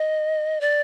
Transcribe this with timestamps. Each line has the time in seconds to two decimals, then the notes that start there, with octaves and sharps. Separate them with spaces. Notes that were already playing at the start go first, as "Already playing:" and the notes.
Already playing: D#5
0.61 D5